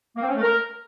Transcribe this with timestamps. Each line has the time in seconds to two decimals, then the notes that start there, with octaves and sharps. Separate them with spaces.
0.15 A#3
0.22 C4
0.28 C#4
0.35 A3
0.41 A#4